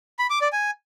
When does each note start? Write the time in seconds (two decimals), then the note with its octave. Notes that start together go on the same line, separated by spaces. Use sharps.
0.19 B5
0.30 D6
0.41 D5
0.53 G#5